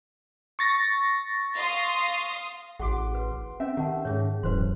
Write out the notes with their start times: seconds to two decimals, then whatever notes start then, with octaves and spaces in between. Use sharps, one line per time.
0.59 C#6 A6 A#6
1.54 F5 C6 D#6
2.80 A1 F#4 G#4 F#5 C6 D6
3.15 B4
3.60 C4 C#4 E5 G5
3.77 D#3 G4 F#5 A5
4.05 G#2 C#4 G#4 C#5
4.43 D1 F#2 E3 B4 C5 C6